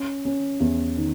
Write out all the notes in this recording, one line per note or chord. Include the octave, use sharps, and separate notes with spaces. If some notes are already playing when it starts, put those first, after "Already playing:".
Already playing: C#4
C#4
E2
D#3